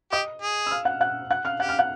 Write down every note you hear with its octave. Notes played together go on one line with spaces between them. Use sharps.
G4 D#5 D#6
G#4
E6
F5 F6
F#5 F#6
F#5 F#6
F#5 F#6
F5 F6
G4 F#5 F#6
F5 F6
F#5 F#6